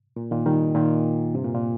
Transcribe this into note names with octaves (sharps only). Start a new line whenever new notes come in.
A#2
A#2 D#3
D#3 G3
A#2 D#3
G2 C3
A#2
A#2